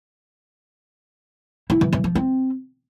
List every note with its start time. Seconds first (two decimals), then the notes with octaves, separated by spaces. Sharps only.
1.70 E4
1.81 E3
1.93 E3
2.04 F3
2.15 C4